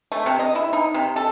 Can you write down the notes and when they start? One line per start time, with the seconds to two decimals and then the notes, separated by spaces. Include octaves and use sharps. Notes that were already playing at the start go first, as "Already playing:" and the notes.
0.12 A3
0.26 C3
0.39 D#5
0.55 E4
0.73 D#4
0.94 C3
1.16 A4